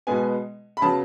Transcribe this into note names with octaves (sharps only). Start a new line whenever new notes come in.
B2 G#3 B3 G#5
B5
C#3 F#3 B3 A5